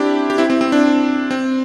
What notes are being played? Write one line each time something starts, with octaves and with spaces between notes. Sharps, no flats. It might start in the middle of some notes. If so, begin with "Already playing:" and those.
Already playing: C4 D4 E4 G4
G4
C4 E4
C4
C4
D4
C4